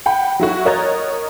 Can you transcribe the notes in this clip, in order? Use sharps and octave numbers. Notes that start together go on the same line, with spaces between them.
F#5 G5 B5
F#3 E4 F#4
A#4 C#5 D#5 A#5 F#6 A6